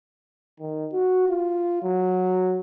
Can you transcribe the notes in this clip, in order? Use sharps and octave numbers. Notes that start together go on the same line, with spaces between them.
D#3
F#4
F4
F#3